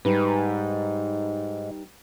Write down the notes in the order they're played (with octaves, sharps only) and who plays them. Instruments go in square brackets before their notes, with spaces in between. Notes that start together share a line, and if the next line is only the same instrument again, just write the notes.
[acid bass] G#2 [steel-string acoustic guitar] G3 D#4 B4